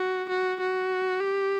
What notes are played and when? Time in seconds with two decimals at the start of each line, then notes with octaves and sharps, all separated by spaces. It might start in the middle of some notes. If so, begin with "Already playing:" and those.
Already playing: F#4
0.29 F#4
0.60 F#4
1.21 G4